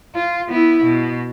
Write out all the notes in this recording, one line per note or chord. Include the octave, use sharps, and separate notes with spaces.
F4
B3 E4
B2